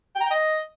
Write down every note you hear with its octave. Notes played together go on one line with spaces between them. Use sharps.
G5
A#5
G5
D#5